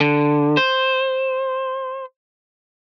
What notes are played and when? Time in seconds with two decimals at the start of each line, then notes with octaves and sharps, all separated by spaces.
0.01 D3
0.57 C5